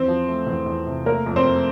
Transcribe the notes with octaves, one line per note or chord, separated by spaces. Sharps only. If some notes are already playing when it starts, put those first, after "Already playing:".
Already playing: E2 C4 C5
F3
A3
E2
E2
C3
A3 A#3 A#4
F2
C4 C5
A3